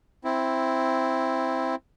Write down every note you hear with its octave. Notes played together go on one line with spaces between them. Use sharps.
C4 E4